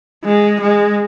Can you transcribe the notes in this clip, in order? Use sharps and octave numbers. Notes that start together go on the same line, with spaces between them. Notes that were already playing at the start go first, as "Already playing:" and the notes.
G#3
G#3